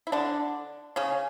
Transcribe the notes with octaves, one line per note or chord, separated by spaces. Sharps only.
E4
D3 D4
C#3 C#4